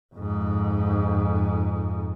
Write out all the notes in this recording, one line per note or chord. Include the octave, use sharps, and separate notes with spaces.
F2 G#2